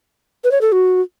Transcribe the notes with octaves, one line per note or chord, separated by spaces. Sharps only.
B4
C#5
A4
F#4